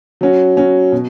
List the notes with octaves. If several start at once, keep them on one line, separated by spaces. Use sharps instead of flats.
F#3 C#4 F#4
F#3 C#4 F#4
B2